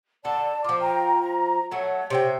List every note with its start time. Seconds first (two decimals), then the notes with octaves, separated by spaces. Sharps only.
0.25 D3 A4 D5 A5
0.64 F3 F4 D6
0.81 G5 A#5
1.22 A#5
1.71 F#3 A3 C#5
2.10 C3 C#5 E5 G5